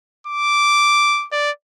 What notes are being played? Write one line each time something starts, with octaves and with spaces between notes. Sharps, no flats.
D6
D5